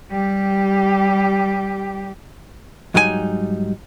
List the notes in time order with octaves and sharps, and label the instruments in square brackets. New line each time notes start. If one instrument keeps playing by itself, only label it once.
[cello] G3 G4
[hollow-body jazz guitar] G#2 F#3 G3 D#4 G4 G#5